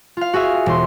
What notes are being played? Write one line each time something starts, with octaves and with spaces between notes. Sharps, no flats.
F4 F5
F#4 G#4 E5 F5
E1 C6